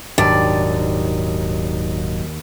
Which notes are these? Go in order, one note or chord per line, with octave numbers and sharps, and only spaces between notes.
D#1 D#2 G#2 F#3 D4 D#4 D5